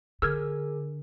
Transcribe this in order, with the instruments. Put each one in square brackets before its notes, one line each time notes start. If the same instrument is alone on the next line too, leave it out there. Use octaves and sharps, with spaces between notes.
[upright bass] D3 [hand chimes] G#4 A#4 [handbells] E6 F6 G#6